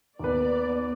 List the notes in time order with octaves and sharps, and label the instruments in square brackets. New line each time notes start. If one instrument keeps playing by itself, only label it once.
[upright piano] D#2 B4 [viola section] B3 D5